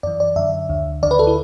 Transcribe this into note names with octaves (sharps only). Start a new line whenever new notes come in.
F#2 E3 D5
D5
F#2 D3 E5
D2 D3
D2 D3 D5
B4
A4
E4